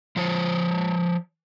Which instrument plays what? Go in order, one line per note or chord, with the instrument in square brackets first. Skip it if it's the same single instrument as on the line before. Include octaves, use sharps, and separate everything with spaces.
[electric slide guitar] F3 C5 C#5